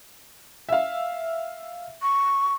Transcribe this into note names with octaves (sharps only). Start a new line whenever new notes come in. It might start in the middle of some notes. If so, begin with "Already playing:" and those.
E5 F5
C#6